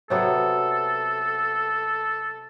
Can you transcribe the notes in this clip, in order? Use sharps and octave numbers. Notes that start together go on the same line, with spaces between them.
C3 F#3 B3 A4